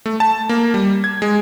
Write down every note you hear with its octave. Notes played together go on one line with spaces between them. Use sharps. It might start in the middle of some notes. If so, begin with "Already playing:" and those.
A3
A5
A#3
G3
G#6
G#3